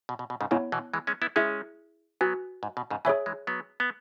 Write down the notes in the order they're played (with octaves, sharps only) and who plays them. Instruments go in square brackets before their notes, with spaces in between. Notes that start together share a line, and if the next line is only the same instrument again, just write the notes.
[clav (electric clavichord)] B2
B2
B2
G#2 C#3
[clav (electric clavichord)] G#2 C#3 [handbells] B3 E4 C#5
[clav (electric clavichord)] B2 E3
E3 G#3
G#3 C#4
B3 E4
[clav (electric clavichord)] G#3 C#4 [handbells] E4 G#4 E5
[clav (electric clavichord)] F#3 B3 [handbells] F#4 B4 G#5
[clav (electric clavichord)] G#2
B2
G#2 C#3
[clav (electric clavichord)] B2 E3 [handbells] G#4 C#5 E5 G#5
[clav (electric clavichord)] E3 G#3
F#3 B3
B3